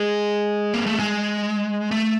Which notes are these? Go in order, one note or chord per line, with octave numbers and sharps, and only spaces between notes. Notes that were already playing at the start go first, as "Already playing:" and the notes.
Already playing: G#3
A#3
A3
G#3
A3